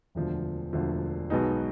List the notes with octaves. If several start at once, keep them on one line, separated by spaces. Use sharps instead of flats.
E1 D2 D3 F3
E1 D2 D3 F3
B1 B2 G#3 B3 D#4